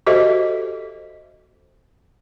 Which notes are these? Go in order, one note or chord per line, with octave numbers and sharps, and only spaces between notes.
F#4 G4 A4 C5 D#5 E5